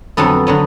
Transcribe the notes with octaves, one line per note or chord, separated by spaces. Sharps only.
F2 D3 F#3 B3 A4
D3 F#3 B3